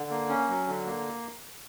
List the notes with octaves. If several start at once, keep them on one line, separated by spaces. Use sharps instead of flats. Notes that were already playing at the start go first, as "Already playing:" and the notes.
Already playing: D3
A#3
C#4
F#3
D3
A#3